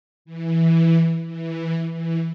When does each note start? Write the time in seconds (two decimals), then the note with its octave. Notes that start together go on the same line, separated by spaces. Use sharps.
0.25 E3
1.27 E3
1.93 E3